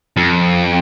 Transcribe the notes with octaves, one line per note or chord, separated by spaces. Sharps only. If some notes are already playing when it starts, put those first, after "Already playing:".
F2